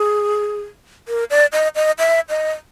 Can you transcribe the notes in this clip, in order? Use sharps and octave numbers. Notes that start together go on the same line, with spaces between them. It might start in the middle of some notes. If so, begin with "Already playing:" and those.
Already playing: G#4
A#4
D5
D#5
D#5
E5
D#5